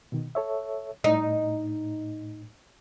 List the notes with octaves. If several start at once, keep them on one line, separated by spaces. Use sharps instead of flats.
B2 D#3
A4 C#5 E5
A2 D#4